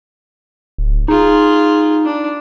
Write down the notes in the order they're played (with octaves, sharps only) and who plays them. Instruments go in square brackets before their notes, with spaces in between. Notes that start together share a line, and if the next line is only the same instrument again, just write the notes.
[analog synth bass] D1
[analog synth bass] D#4 [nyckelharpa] F4 G#4
[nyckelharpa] D4